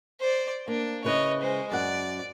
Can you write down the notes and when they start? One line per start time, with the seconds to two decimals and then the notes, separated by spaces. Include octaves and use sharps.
0.20 C5 D5
0.68 A#3 D4
1.04 C#3 E4 B4 C#5 D#5
1.41 G#3 C5
1.71 F#2 D5 F#5